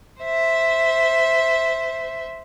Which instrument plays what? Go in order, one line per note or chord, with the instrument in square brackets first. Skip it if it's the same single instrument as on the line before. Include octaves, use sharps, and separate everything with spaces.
[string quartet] C5 E5